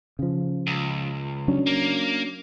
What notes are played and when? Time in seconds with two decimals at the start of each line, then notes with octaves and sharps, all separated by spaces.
0.19 C#3 F3
0.67 C#2
1.48 F#3 C#4 D4
1.67 A#3